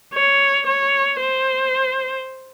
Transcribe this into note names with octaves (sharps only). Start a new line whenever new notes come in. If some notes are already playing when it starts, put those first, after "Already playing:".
C#5
C#5
C5